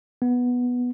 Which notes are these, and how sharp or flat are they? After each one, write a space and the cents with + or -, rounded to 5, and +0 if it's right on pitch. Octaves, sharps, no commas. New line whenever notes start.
B3 -5